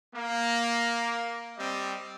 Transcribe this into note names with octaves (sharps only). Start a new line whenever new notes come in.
A#3
G3 C4 D#5